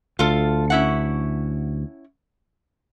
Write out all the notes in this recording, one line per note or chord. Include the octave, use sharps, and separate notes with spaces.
D2 F4 A4
C#4 E4 F#5